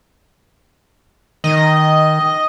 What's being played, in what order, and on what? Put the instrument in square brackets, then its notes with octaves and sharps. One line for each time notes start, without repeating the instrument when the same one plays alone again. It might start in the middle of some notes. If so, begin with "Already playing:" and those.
[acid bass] D#3 [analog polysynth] D#5